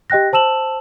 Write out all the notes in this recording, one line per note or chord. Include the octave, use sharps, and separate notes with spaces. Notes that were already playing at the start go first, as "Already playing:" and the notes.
G4 D#5 G5 F#6 A#6
C5 A5 E6 E7 F#7